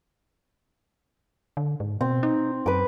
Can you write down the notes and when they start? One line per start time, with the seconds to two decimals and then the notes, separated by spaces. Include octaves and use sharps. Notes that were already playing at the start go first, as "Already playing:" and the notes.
1.57 D3
1.80 G#2
2.01 B2 C4
2.23 D#4
2.66 F#2 B4 D6